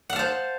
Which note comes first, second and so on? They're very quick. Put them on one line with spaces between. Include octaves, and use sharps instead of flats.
F#5 F5 A5 C5